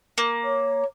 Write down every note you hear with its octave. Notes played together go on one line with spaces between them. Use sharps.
A#3
C#5